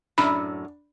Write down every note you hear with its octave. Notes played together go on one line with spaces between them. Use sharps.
F#2 A2 D4 B5